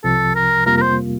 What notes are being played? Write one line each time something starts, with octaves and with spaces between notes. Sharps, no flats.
C2 C3 F3 A4
A#4
F2 C3 G3 A#3 F4 A#4
A#4
C5